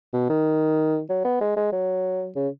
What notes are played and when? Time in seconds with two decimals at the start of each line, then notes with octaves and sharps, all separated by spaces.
0.13 B2
0.30 D#3
1.09 F#3
1.24 B3
1.40 G#3
1.56 G#3
1.72 F#3
2.36 C#3